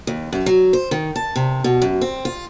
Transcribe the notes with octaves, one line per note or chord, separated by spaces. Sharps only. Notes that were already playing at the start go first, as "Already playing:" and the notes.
D#2
F#2
F#3
C5
D#3
A5
C3
B2
F#2
C4
F4